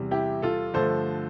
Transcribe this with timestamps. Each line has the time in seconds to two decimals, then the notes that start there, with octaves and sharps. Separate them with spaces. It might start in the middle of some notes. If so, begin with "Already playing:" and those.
Already playing: E2 C3 G3
0.11 E4 G4
0.42 F4 A4
0.74 G2 D3 F3 A3 A4 C5